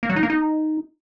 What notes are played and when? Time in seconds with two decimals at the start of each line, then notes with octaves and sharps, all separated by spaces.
0.03 A#3
0.10 F#3
0.16 D#4
0.23 A#3
0.30 D#4